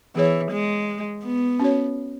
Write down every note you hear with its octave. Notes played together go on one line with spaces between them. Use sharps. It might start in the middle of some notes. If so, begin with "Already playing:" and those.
E3 B3 G#4 C#5
G#3
B3
C#4 F#4 C#5